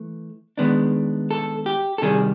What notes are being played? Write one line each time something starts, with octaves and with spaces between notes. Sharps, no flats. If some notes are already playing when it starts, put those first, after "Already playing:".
Already playing: E3 A3
D#3 G#3 B3 D4
A4
G4
A4
C3 D#3 G3 G#4